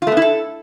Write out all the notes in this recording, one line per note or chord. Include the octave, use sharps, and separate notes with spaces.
F4
A3
B3
E4
A4